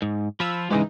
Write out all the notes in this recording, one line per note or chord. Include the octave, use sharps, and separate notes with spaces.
G#2
F3 F4 B5 E6
G#2 C#3 E3 G#3 D#4